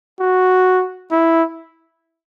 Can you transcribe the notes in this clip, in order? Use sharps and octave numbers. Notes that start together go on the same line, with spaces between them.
F#4
E4